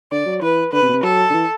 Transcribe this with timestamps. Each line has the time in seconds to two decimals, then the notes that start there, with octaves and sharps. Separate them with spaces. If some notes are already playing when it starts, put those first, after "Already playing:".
0.12 D3 D5
0.26 F#3
0.42 E3 B4
0.73 D3 B4
0.82 C3
0.89 B2
0.93 C3
1.03 F#3 A4
1.30 D3
1.34 E3